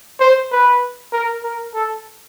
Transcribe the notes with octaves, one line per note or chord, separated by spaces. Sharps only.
C5
B4
A#4
A#4
A4